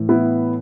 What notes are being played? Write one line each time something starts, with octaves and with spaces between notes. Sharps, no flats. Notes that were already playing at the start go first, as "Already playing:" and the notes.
Already playing: A2 E3
B3 E4